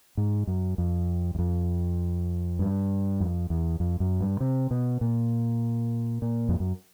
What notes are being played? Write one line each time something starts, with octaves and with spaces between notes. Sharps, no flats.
G#2
F#2
F2
E2
F2
G2
F2
E2
F2
F#2
G2
C3
B2
A#2
A#2
F2
F#2